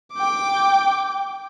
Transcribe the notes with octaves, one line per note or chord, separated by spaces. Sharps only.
G5 D6